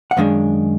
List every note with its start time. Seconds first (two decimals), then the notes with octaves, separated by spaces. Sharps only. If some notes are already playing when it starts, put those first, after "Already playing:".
0.11 F#5
0.17 F#2 D#3 G#3 D4 F5